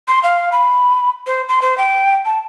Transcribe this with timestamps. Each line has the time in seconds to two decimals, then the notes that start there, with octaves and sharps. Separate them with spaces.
0.08 C6
0.23 F5
0.52 B5
1.27 C5
1.49 C6
1.62 C5
1.78 G5
2.25 A5